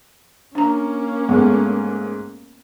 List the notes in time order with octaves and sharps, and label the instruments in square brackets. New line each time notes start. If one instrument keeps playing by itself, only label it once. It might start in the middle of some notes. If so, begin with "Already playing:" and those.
[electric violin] A#3 C#4 [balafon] D4 A#5
[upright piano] G#2 A3 [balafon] B3